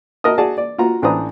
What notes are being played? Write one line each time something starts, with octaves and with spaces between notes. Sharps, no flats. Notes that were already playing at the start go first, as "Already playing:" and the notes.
F#4 A#4 D#5 A5 D#6
F#4 G#4 D5 A5
D5
F4 F#4 A#5
A1 D4 B4 C5 A#5 D#6